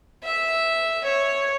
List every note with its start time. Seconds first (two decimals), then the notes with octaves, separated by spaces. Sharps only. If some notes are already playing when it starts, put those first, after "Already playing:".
0.23 E5
1.04 C#5